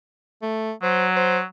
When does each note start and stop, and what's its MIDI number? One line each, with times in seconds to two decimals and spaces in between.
0.42 0.72 57
0.83 1.43 54
0.83 1.06 72
1.16 1.38 72